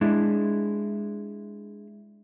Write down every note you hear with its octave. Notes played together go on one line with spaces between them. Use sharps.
G#3 D4 E4